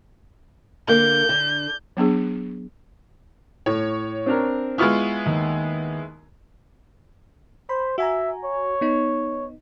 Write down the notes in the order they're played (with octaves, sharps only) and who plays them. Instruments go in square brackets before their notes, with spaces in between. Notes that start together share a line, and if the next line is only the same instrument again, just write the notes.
[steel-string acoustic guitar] D3 A#3 [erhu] G6
[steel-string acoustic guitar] D3
[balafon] F#3 B3 D4 G#4
[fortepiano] A2 [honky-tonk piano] C#5
[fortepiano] C4 D4 A#4
[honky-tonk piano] G#3 B3 E4 [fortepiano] F4 C#6 F6
[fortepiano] D#2
[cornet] C5 [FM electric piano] B5
[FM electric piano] F#4 G#5 A#5 [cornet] E5
[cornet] C#5
[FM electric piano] B3 D#4